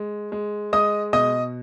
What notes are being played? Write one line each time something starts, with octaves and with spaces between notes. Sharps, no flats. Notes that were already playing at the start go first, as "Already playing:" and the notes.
Already playing: G#3
G#3
G#3 D#5 D#6
B2 D#5 D#6